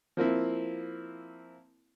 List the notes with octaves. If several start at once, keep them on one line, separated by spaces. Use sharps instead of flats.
F3 A#3 C4 E4